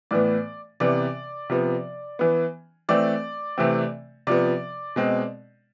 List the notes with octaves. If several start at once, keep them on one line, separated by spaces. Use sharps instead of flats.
A2 E3 B3 D5
C3 E3 B3 D5
C3 F3 B3
E3 B3
E3 A3 C4 D5
C3 E3 A3 C4
C3 F3 B3 D5
B2 G#3 C4